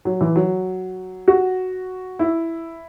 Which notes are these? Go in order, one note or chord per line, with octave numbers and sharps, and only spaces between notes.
F#3
E3
F#3
F#4
E4